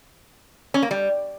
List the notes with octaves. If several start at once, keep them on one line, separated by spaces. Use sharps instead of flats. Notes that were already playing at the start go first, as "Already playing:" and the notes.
C#4
A#3
G3